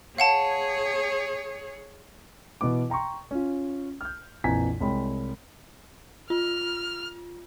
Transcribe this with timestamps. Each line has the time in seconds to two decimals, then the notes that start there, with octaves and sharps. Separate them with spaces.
0.18 G#4 C#5 F5 F#5 A5
2.61 B2 E3 B3 D6
2.90 G5 A#5 C6 C#6
3.31 C#4 F4
4.01 F6 G6
4.44 A#1 F2 E3 G#5 A#5 B6
4.80 C2 G#3 C#5 G5 B5
6.30 F4 F6